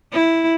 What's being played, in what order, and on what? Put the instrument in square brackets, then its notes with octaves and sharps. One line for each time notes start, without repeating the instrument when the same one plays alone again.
[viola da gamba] E4